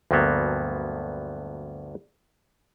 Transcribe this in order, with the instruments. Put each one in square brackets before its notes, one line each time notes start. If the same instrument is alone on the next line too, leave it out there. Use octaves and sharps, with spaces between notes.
[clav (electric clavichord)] D2 G2 F3 F#3 A#3 B3